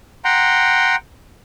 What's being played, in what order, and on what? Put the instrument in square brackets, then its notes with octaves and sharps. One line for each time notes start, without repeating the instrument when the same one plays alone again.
[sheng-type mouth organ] F#5 G5 A#5 C6